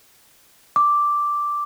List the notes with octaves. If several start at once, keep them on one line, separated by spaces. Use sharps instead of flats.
D6